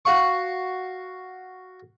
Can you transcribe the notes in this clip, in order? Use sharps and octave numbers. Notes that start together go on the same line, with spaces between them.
F#4 F5 C#6